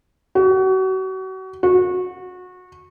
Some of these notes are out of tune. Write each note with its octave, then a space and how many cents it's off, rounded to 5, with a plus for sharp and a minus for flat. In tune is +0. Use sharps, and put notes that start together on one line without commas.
F#4 +35
F#4 -25